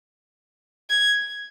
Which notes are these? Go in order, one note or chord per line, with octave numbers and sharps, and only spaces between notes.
G#6